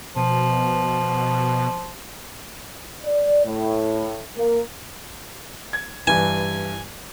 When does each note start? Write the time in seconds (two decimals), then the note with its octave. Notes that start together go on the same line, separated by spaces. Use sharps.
0.16 B2 F3
3.04 D5
3.46 A2
4.37 A#3
5.73 G#6
6.07 G2 E3 G#5